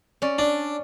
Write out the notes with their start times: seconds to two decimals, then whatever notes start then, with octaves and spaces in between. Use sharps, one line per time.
0.22 C#4 D5
0.39 D4